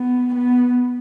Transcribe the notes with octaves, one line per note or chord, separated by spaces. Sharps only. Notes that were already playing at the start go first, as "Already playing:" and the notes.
Already playing: B3
B3